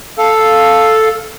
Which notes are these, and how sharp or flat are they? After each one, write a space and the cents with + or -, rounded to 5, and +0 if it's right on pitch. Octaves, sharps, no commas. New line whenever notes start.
A4 +0 F5 +0